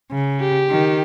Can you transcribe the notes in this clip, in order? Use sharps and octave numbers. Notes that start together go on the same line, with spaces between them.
C#3
G4
D#3